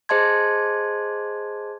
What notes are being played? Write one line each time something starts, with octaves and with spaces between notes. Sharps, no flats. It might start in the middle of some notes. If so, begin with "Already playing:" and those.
G#4 C5 D#5 A5 C6 G#6